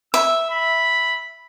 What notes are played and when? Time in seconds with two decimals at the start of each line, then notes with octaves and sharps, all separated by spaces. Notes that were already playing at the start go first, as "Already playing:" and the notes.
0.14 E5 E6
0.50 B5